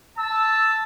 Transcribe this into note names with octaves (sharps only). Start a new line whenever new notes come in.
A5 E6